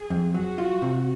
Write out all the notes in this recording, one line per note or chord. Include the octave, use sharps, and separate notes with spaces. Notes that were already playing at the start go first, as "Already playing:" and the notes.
Already playing: G#4
F2
F#3 F#4
F4
C3